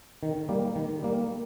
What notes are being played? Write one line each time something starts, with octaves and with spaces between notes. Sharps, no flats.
D#3
G3 A#3
D#3
G3 A#3